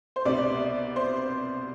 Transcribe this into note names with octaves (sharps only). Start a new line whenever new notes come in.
C5
C2 B2 B3 D5
C5